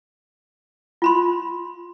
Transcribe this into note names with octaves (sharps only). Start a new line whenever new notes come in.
F4 B5 C6